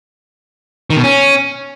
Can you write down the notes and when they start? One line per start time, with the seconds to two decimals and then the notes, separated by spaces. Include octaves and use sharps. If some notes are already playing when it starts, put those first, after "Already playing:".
0.90 D#3
0.97 B2
1.03 C#4